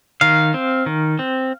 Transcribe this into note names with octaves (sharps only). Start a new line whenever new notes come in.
D#3 F5
C4
D#3
C4